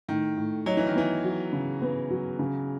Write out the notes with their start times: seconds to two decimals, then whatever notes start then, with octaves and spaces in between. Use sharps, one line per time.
0.08 A2 D#3
0.37 A2
0.66 F#3 D#4
0.77 E3
0.87 D#3
0.95 E3 B3
1.24 F#3
1.53 C#3
1.82 B3
2.10 F#3
2.39 C#3